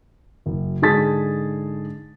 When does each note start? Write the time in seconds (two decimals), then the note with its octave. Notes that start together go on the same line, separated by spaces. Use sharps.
0.46 F#1
0.82 G#2 D3 G#4 A5 A6 B6